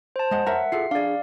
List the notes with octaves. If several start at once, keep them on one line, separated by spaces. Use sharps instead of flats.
C5 A5
G#3 D#5 F#5
A#4 C#5 E5 F#5 A#5
F4 G#4 A4 C7
D4 G#4 D5 F5